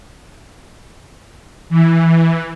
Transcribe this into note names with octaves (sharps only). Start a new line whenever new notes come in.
E3